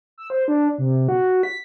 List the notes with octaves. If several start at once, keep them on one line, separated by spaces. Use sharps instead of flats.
E6
C5
D4
C3
F#4
B6